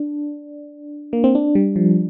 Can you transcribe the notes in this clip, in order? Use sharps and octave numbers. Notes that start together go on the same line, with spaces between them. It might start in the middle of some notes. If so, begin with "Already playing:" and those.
Already playing: D4
A#3
C4
D4
G3
F3